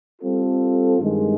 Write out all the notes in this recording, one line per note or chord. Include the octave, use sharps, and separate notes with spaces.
G3 C4 F4 A4
G2 D#3 G#3